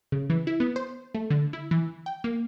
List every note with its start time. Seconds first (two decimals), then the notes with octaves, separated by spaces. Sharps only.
0.12 C#3
0.30 E3
0.47 E4
0.60 B3
0.76 C5
1.14 A3
1.30 D3
1.53 E4
1.71 E3
2.06 G5
2.24 A#3